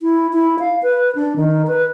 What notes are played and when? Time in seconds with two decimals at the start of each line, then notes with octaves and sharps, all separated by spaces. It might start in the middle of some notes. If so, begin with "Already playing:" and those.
0.01 E4
0.33 E4
0.59 F5
0.83 B4
1.15 D4
1.36 D#3
1.67 B4